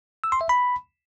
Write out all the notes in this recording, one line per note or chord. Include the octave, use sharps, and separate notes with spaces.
E6
C6
E5
B5